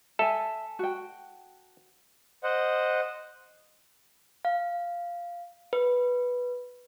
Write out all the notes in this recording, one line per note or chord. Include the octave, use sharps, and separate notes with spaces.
A4 E5 G#5
F#4 G5
C5 D#5 F#5
F5
B4